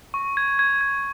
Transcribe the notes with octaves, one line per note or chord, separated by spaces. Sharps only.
C#6
G#6
G#6
G#6